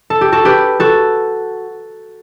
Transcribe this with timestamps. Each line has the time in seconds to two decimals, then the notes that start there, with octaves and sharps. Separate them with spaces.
0.10 A4
0.21 G4
0.32 F#4 A4
0.45 G4 B4
0.80 F#4 A4